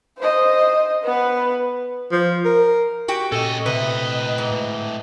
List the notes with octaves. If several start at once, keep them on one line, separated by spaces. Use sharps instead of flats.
C5 D#5
B3 B4
F3
A#4
F#4 G4 G5
A#2 C#4 A4 D#5
A2 C3 B4 D#5
G#2